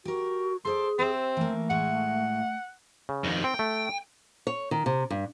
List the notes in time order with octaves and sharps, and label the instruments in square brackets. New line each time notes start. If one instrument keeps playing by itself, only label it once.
[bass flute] F#4 [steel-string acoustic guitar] G4 A#4
[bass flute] G#4 [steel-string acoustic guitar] A4 C5 D5 [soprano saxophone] C6
[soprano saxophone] C4 [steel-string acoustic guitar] G4 C5 E5
[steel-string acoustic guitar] E3 A#3 [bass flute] A3
[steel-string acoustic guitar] A2 G#3 C#5 [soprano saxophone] F#5
[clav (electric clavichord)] C#3
[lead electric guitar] F2 D#3
[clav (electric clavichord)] C4 [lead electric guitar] G5
[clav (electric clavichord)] A3
[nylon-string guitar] C#5
D#3
C3
G2